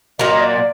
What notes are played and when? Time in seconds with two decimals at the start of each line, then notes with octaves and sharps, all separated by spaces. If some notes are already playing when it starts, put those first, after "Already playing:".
0.19 A#2 F#3 A#3 D#5
0.31 D#5
0.41 D5